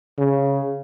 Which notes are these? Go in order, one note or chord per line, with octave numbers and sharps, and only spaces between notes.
C#3